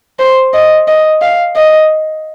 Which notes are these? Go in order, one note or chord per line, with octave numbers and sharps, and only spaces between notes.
C5
D#5
D#5
F5
D#5